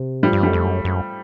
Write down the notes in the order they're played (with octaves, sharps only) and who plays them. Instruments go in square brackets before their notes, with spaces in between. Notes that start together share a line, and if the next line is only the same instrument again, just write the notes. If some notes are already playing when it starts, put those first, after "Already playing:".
Already playing: [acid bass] C3
[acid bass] A2 [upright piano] F3 G3
[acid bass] G2
[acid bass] F#2 [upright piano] G3 A3
[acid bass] F2
F#2
F#2